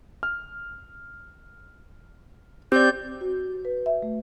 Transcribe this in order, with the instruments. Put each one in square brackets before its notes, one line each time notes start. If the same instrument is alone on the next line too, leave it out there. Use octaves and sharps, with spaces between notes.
[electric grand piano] F6
[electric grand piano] C4 [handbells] G4 D5 [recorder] G6
[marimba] F#4
B4
E5
A3